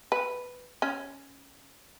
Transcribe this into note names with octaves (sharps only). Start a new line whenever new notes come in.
B4
C#4